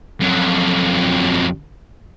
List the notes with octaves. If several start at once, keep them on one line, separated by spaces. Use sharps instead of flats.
F2 F#3